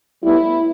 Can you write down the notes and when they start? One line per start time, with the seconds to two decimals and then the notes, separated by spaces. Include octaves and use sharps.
0.24 A2 G3 B3 E4